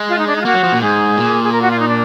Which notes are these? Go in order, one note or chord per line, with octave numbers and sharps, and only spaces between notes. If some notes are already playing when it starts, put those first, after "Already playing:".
Already playing: G#3
F4
D#4
D4
D#4
F4
A#3 F#4
F#3
F3
A#2
G#2 G#4
A#2
G#4
A#4
F#4
F4
D#4
D4